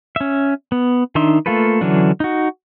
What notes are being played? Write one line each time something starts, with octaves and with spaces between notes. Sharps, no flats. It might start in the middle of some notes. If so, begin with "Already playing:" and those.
C#4 E5
B3
D#3 D4 D#4 E5 C6
A3 A#3 F4 A4 B4
D3 E3 F#3 C#4 D4
D#4 F#4